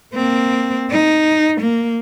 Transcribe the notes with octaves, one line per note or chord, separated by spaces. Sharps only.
A#3 C4
D#4
A#3